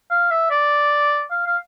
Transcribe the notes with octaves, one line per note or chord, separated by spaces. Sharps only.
F5
E5
D5
F5
F5